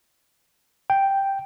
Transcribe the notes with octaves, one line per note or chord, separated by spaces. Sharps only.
G5